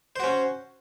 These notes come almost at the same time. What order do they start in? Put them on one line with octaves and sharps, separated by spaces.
C5 F#4 C#4